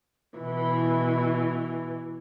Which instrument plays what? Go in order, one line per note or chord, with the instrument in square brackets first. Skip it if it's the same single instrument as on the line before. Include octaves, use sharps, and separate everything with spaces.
[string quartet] B2 E3